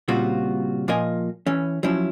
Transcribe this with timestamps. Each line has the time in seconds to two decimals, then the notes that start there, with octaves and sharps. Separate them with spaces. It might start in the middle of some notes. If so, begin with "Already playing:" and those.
0.08 A#2 C#3 G3 C4 F4 F#4
0.88 A#2 F3 F4 A#4 D#5 G#5
1.46 E3 C#4
1.83 F3 F#3 C#4 E4